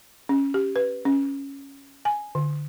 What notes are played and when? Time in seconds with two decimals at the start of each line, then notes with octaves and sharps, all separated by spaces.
0.29 C#4
0.54 G4
0.76 B4
1.05 C#4
2.05 G#5
2.35 D3